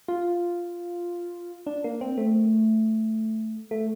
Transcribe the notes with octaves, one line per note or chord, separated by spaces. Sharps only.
F4
D4
A#3
C4
A3
A3